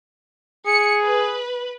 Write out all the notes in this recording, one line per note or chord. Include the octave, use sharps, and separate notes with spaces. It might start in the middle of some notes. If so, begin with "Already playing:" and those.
G#4 C#7
B4